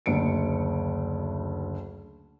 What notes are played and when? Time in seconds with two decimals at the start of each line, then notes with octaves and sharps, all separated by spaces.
0.06 F#1 D2 C#7 D7